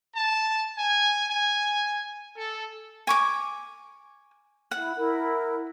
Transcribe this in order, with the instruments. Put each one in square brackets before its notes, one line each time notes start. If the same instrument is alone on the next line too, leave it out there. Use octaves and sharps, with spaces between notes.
[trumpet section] A5
G#5
G#5
A4
[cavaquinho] G#5 C#6 D6
[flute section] E4 [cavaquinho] F#5
[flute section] E4 A#4